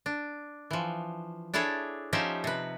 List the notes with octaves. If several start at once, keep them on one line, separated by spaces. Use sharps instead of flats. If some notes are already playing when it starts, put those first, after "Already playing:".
D4
E3 F3
D4 E4 G#4 A4 C#5
F3 C#4 D#4 G4 C5 E5
C3 B4